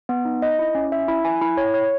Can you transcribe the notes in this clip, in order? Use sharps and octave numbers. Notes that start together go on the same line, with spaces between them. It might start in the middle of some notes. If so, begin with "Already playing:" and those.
B3
D#4
D#5
E4
C#4
E5
E4
G#5
E4
C#5
C#5